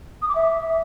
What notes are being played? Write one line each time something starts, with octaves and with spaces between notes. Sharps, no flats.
D#6
D6
E5